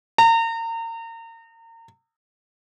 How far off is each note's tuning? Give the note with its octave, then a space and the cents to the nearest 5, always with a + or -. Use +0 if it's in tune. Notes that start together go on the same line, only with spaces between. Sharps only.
A#5 -35